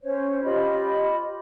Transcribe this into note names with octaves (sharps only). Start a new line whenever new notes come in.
C#4 C5 C#5
F4 G4 D#5 B5